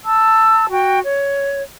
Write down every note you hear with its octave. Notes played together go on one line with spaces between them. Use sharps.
A5 E6
F#4 G5
C#5